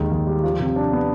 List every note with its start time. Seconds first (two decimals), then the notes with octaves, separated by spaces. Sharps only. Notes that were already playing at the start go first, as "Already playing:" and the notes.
Already playing: D#2 D#3 G#3
0.11 D#2
0.27 G3
0.43 F3
0.60 C3
0.76 D4
0.93 B3